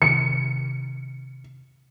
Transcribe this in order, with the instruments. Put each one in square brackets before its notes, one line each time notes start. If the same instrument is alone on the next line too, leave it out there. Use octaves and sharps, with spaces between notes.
[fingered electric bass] C3 D#3 [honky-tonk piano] C#7